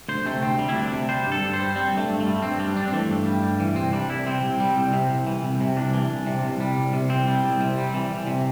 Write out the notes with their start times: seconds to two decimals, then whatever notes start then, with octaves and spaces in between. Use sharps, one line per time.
0.09 D2 C5
0.26 C3 A3
0.42 D2 C4
0.59 G3
0.69 E4
0.75 D2 D4
0.92 C3
1.09 G3 C5
1.26 G2
1.32 A4
1.43 G2
1.53 C5
1.60 G3
1.75 G3 C4
1.92 G2
1.97 A3
2.10 G2
2.20 A3
2.26 G3
2.42 G2 C4
2.59 G3 D4
2.76 G2 D4
2.88 C4
2.93 E3 A3
3.10 G2
3.26 G3
3.42 G2
3.60 E3
3.76 C2 C4
3.93 G3 D4
4.10 C2 E4
4.26 C3 C4
4.43 C2
4.60 G3
4.76 C2
4.93 C3
5.09 C2
5.26 E3
5.43 C2
5.60 C3
5.76 C2 D4
5.93 E3
6.10 C2
6.27 C3
6.44 C2
6.60 G3
6.77 C2
6.93 C3
7.10 C2 C4
7.27 G3
7.44 C2
7.61 C3
7.78 G3
7.94 E3
8.11 C2
8.27 C3